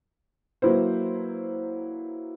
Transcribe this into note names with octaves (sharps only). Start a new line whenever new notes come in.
F#3 A#3 E4 B4 C5